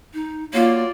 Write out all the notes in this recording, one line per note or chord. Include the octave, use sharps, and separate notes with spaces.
D#4
F#3 A#3 F4 D5